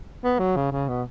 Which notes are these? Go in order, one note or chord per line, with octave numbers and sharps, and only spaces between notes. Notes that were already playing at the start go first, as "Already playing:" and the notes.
B3
F#3
C#3
C#3
B2